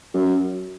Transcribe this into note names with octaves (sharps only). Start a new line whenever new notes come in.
F#2